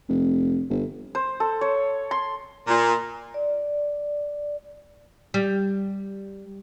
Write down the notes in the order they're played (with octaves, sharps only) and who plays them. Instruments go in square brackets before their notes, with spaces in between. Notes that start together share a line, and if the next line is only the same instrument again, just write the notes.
[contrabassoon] F1
G1
[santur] C5
A4
C#5
C6
[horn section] A#2
[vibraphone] D5
[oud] G3